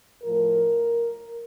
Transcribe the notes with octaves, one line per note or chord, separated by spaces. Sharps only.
A2 F3 A#4